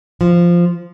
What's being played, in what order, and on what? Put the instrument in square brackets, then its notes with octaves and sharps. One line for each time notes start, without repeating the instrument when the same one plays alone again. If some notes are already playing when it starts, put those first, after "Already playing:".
[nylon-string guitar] F3